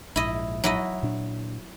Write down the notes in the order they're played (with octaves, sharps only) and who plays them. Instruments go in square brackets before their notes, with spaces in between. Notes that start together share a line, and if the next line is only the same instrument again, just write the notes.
[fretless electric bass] A#1 G#2 [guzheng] E4 D#5
[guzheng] F#3 E4 D#5
[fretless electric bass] A#2 D4